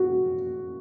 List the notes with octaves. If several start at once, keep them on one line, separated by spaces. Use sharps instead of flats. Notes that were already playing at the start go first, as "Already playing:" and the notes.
Already playing: F#4